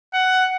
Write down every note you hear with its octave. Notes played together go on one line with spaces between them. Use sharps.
F#5